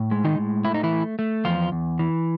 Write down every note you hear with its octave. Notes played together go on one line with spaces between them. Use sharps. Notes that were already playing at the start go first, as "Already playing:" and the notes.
Already playing: A2
G#3
D#3 D#4
A2
A3 E4
D#4
E3 E4
A3
A3
E2 F3 F4
E2
E3